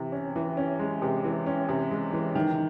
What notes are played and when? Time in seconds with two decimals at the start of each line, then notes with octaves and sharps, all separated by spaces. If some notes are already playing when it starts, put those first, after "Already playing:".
Already playing: C3 E3
0.12 C#4
0.36 E3
0.57 C#4
0.79 G#3
1.02 C3
1.24 E3
1.46 C#4
1.69 C3
1.91 G#3
2.13 E3
2.35 D#3